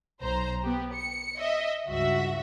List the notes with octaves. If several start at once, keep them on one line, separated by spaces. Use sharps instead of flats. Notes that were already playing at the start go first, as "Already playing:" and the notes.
B1 C5 A#5
B3 G4
C#7
D#5 E5
C#2 G2 F#4 E5